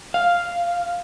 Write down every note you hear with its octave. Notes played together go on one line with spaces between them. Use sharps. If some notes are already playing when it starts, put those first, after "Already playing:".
F5